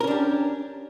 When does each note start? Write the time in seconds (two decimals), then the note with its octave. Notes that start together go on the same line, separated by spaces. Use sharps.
0.01 A#4
0.04 C#4
0.07 D4
0.11 G4